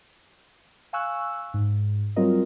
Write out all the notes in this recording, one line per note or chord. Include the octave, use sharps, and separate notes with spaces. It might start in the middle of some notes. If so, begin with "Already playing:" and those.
F5 G#5 C#6 E6 F#6
G#2
F#3 G3 C4 F4 A#4 D#5